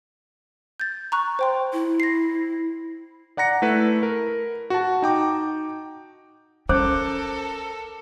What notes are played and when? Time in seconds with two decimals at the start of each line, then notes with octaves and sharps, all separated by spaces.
0.80 G6 A6
1.12 A#5 C#6 F#6
1.39 C5 G5 C6
1.73 E4
2.00 A#6 C7
3.37 D5 F#5 A#5 A#6 C#7
3.62 A3 E4 B4
4.03 A#4
4.70 F#4 A5
5.02 D#4 G5 D6
6.69 C#4 A4 A#4 C5 D6 G6